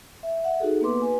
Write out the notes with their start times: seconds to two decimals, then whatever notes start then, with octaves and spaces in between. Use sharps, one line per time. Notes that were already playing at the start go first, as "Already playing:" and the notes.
0.23 E5
0.44 E5 F#5
0.60 D#4 F#4 G#4 A4
0.81 A#3 B3 B4 C6 D6
1.02 B4 G#5